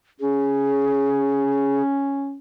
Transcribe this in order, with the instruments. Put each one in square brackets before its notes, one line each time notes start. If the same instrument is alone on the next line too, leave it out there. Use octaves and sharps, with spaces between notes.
[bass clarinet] C#4 [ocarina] G#4